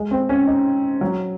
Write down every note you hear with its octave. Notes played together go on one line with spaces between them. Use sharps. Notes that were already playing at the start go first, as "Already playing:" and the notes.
Already playing: G#3
C4
C#4
D#4
F#3